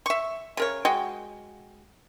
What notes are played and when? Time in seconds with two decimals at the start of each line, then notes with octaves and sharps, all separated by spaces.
0.06 E5 C#6
0.57 C#3 A#4 C#5
0.85 G#3 F#4 D#5 G5